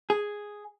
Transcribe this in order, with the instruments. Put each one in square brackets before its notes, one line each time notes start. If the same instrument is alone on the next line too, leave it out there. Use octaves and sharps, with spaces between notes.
[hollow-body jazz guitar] G#4